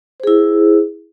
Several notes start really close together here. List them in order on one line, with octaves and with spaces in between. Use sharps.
C5 G#4 E4